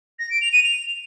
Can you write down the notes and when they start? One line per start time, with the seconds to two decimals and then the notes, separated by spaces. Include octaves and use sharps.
0.19 A#6
0.30 D7
0.41 F7
0.52 D#7
0.63 F7